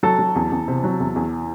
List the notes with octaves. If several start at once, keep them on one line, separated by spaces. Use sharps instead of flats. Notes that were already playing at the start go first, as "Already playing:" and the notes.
F#3 A4
F#3
E2
E2
C3
F#3
E2
E2